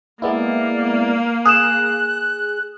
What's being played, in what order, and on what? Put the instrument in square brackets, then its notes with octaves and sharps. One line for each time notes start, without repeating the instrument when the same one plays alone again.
[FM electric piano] G#3 B3 E4 [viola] A#3 [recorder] D5
[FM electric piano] G#4 [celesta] D#6 E7 [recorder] F#6